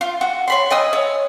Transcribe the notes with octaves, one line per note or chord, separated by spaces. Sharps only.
F4
F#4
C#5 B5 C6
D#5 G#5 D#6 E6
C#5